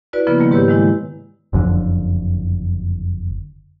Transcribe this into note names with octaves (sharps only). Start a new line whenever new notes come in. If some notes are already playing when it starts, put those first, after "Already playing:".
E4 F#4 B4 D5
C#3 F3 A#3 B3 E4 B4
D#3 G3 A#3
G#2 G4 B4 C#5 E6 G6
D#3 G#3 E4
F#1 F2 G#2 D3